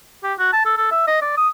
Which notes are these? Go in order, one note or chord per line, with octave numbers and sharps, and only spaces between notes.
G4
F#4
A5
A4
A4
E5
D#5
D5
D#6